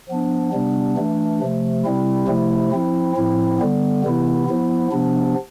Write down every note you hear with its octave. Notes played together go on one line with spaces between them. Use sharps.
F3 B3 D4
C3 G3 B3 D4
E3 A3 D4
C3 F3 A3
C3 G3 C4 E4
C3 F3 A3 E4
F3 C4 E4
A2 F3 C4 E4
D3 G3 B3
C3 E3 B3 E4
F3 B3 E4
C3 F3 B3 D4